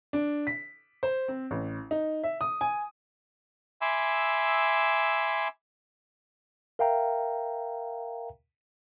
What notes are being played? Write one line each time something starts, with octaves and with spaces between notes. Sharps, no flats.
D4
B6
C5
C4
A1
D#4
E5
D#6
G#5
E5 G#5 B5 C6 D6 E6
A#4 E5 F5 G5 A#5